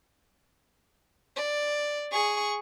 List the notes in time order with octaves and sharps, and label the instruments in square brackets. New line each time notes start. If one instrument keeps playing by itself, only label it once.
[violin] D5
G#4 C#6